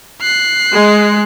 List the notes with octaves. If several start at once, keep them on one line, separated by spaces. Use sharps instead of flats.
F#6 C7
G#3